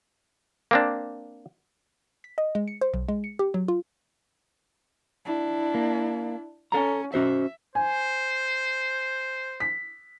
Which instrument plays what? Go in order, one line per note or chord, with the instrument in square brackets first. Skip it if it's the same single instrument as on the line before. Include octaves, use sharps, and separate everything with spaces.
[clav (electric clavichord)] A#3 C4 D4
[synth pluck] B6
D#5
G#3
C#7
C5
B1
G#3
C#7
G4
F#3
F4
[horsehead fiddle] D4 E4
[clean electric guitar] A#3
[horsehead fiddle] C#4 [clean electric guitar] A4 A#5
[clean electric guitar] C#4 F#4 C5 [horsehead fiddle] E5
[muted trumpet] C5 [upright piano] G#5
[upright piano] B6